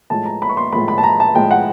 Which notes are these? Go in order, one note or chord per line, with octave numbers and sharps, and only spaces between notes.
A2 F3 G#3 A5
A#5
B5
C#6
C6
A2 F3 G#3 B5
B5
A5
A#5
A5
A2 F3 G#3 G5
F#5